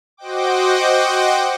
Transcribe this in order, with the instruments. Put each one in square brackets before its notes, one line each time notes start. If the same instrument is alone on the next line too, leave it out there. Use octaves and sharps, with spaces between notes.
[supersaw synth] F#4 C5 D#5 F#5 G5 D6